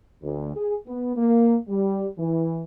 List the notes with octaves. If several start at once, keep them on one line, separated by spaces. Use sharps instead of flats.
D2
G#4
B3
A#3
G3
E3